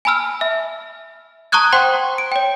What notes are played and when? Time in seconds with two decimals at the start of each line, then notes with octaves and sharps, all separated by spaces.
0.05 G#5 A5 B5 E6 F6
0.41 E5
1.52 A5 A#5 C#6 D#6 F#6 G#6
1.73 C5 F#5 G5 C6
2.18 D7
2.32 C#5 G5